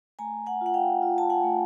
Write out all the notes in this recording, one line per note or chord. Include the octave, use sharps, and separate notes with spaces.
A3 G#5 A#5
F#5 G#5
F4 F#5
F5 G5
F4
A5
F#5 G#5
A3